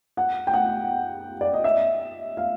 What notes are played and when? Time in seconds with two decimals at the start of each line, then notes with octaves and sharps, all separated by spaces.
0.17 F#5
0.47 G5
0.54 F#5
1.41 D5
1.53 D#5
1.64 E5
2.37 F5